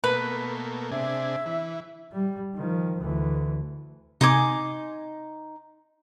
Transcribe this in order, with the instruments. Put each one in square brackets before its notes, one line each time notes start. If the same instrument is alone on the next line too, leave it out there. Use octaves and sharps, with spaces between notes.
[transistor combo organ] B2 A3 A#3 [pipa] B4
[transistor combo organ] C3 D4 G#4 [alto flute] E5
[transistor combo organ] E3
[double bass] G3
D#3 F3
D2 E3
[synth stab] C3 G#5 [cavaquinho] D#4 C6 D6